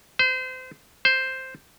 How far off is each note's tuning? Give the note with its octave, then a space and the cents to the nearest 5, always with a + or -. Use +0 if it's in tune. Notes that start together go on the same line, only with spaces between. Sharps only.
C5 -30
C5 +0